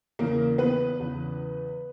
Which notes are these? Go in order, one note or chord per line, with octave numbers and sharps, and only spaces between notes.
E2 C#3 E3 A#3 A#4
B3 B4
E2 C#3 E3